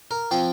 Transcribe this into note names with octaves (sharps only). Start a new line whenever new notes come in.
A#4
F3 C4 G5